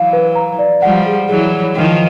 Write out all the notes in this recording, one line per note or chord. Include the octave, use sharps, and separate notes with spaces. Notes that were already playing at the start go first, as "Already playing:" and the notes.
Already playing: E3 F#3 F5
B4
A#5
D5
F3 G3 F#5
G#4
E3 F#3 G#4
C#5
D#3 F3 G5